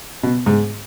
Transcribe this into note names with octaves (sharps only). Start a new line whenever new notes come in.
B2
G#2